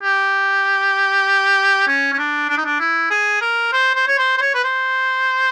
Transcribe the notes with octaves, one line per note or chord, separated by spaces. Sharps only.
G4
C#4
C#4
D4
D4
D#4
D4
E4
G#4
A#4
C5
C5
C#5
C5
C5
C#5
B4
C5